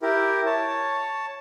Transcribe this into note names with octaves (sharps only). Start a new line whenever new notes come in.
E4 G4 A#4
C#5 A5